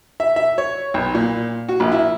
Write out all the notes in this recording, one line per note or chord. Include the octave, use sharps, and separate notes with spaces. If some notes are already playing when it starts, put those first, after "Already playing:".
E5
E5
C#5
B1
A#2
F#4
A#1
E4